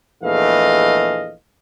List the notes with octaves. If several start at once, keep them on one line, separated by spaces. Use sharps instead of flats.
A#1 E2 E3 A3 D#5 F5